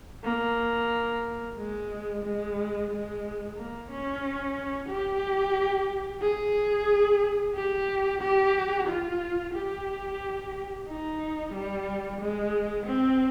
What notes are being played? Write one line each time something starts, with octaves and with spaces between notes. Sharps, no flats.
A#3
G#3
G#3
G#3
A#3
C#4
G4
G#4
G4
G4
F4
G4
D#4
G3
G#3
C4